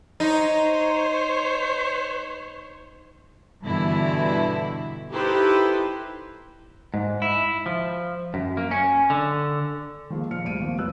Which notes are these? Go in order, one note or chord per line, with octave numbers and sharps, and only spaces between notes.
D#4 C5 C#5
G2 B2 D3 E3 E4
D#4 E4 G4 A4 B4 C5
G#2
E4
F3
F#2
A#3
C#4
D3
D#3 F3 G#3 A#3
A#2 F3 F6 C#7
D2 G2 D7 D#7
B2 D#3 F3 A#3 C4
F1 E2 F#3 B4 E6 F#6